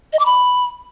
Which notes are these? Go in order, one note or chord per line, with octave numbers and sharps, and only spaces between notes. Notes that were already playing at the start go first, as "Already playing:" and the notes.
D#5
D6
B5